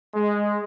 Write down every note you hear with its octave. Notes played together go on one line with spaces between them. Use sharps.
G#3